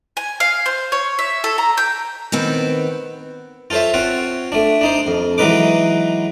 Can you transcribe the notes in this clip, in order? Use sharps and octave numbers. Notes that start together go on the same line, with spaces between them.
G#5
F5
C5
C#5
E5
A4
A#5
G5
D#3 B3 C4
F4 A4 C5 C#5 E5
C4 F4 C#5 F#5
A3 D4
D4 D#4 C5
F2
E3 F#3 G#3 D#4 B4 D6